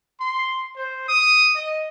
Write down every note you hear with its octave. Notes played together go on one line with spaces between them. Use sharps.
C6
C5
D#6
D#5